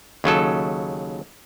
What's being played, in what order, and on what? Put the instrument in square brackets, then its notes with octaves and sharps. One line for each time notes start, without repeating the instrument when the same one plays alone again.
[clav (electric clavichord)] D#2 C#3 F#3 A4